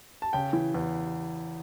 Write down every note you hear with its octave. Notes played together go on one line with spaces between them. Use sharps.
A5
C#3 G5
E3
E2